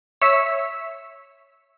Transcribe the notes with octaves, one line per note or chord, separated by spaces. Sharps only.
C#5 E5 E6 B6